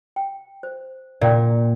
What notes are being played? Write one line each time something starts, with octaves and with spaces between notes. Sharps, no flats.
G5
C5
A#2 D5 F5 G5